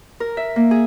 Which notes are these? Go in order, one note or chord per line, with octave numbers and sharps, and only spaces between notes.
A#4
E5
A#3
G#4